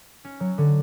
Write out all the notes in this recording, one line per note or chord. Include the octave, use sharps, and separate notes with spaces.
C#4
F#3
D3